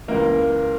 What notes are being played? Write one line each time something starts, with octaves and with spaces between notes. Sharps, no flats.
C#2 C#3 E3 A#3 A#4